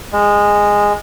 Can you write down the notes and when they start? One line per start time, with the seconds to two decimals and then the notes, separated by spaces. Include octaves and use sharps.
0.13 G#3